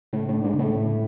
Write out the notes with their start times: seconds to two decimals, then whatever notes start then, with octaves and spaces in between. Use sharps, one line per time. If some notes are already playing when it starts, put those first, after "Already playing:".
0.13 A2 C#3
0.28 A2
0.34 D4
0.44 G#2
0.54 C#3
0.59 A2
0.74 C#3